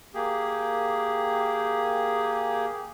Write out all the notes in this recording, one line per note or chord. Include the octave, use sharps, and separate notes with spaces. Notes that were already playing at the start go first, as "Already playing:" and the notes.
A#3 G4 G#4